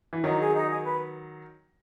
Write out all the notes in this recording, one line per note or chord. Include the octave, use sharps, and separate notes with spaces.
E3
D#3 F#3 D#4
G#4
D#4
G#4
B4